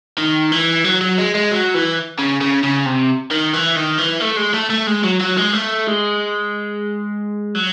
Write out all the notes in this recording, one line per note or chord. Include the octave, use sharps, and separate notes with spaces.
D#3
E3
F#3
F#3
G#3
G#3
F#3
E3
C#3
C#3
C#3
C3
D#3
E3
D#3
E3
A3
G#3
A3
A3
G#3
F#3
F#3
G#3
A3
G#3
F#3